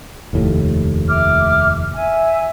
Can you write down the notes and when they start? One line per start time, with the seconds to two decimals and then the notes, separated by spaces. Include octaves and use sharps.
0.33 F1 D#2 A2
1.08 E5 D6 F6
1.95 E5 G#5